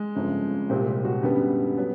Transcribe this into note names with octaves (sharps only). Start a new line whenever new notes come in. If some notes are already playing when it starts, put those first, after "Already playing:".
Already playing: G#3
G1 F2 C#3 F3
C2 A#2 G3 C4 G4
G4
F#4
F#2 D3 G3 B3 G4
F#3 B3